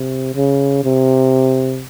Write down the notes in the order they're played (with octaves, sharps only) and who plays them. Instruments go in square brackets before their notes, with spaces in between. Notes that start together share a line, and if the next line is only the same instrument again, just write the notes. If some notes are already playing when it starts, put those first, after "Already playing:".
Already playing: [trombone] C3
C#3
C3